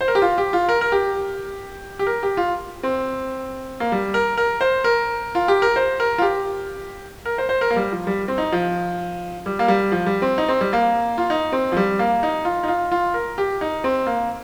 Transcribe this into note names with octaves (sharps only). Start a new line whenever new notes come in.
C5
A#4
G4
F4
G4
F4
A#4
A#4
G4
G4
A#4
G4
F4
C4
A#3
G3
A#4
A#4
C5
A#4
F4
G4
A#4
C5
A#4
F4
G4
A#4
C5
C5
A#4
A#3
G3
F3
G3
C4
D#4
F3
G3
A#3
G3
F3
G3
C4
D#4
C4
G3
A#3
F4
D#4
C4
F3
G3
A#3
D#4
F4
D#4
F4
F4
A#4
G4
D#4
C4
A#3